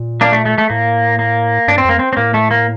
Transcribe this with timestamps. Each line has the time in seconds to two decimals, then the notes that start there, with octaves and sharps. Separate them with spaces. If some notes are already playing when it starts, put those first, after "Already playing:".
Already playing: A#2
0.21 A#3 D4
0.32 A3
0.46 A3
0.58 A3
0.70 A2 A#3
1.19 A#3
1.68 G2 D4
1.78 C4
1.85 F2 A#3
1.99 C4
2.13 C4
2.17 A2 A#3
2.34 A3
2.51 A#3